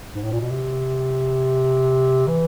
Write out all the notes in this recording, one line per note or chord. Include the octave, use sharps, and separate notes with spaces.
G#2
A2
A#2
B2
C3
E3